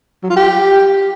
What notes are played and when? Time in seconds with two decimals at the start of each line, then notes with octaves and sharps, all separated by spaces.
0.23 F#3
0.30 F4
0.37 G4